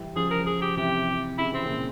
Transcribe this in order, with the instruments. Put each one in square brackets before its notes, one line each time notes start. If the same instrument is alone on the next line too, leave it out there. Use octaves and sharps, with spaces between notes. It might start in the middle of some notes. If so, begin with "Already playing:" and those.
Already playing: [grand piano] E3 G3
[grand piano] C#3 F3 [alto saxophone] G#4
[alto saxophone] A#4
G#4
G4
[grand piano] C3 E3 [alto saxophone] G4
[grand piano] C#3 [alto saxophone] E4
[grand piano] E3 [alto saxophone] C4
[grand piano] A#2 C#3